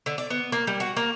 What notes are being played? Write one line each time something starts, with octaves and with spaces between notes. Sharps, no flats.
D3
D5
B3
A#3
G3
F#4
A#3